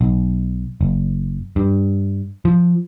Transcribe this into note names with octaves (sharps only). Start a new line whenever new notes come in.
B1
F#1
G2
F3